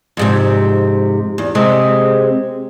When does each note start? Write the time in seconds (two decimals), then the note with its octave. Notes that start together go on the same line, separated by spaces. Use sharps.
0.17 F2 G#2 C3
1.38 E2
1.55 C3 G#3 C4